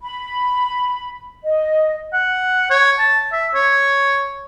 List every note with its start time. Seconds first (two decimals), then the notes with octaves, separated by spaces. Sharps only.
0.01 B5
1.44 D#5
2.13 F#5
2.70 C#5
2.99 A5
3.33 E5
3.54 C#5